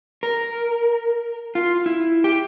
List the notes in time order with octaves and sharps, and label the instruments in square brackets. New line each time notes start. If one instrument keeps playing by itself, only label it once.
[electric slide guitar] A#4
F4
E4
G4